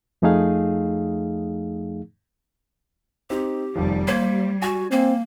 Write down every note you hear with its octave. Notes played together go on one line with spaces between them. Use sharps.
F2 F3 A3 D#4 G#4 F5
C4 D#4 G4
F1 D#3 F3 G3
A#3 C5 G#6 B6
F#4 G#5
A#3 C4